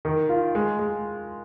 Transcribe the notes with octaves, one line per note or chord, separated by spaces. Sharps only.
D#3
F4
G#3
G#3